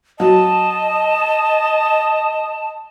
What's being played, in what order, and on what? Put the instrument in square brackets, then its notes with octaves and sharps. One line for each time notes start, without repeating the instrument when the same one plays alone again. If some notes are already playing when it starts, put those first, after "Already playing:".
[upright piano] F#3 [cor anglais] D#5 [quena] A5